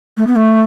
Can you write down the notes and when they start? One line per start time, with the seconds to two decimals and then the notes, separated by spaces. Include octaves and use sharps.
0.17 A3
0.26 B3
0.35 A3